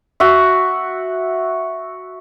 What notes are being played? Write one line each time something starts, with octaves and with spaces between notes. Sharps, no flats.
F#4 E5